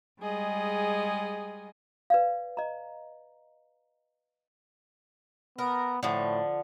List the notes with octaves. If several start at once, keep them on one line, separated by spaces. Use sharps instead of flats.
G3 G#3 G#4 D#5
B4 D5 F5
D#5 A#5
B3 A#4
A2 D3 F3